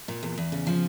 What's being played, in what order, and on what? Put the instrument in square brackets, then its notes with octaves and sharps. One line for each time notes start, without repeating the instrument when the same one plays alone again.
[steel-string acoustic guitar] A#2
E2
E2
C#3
F3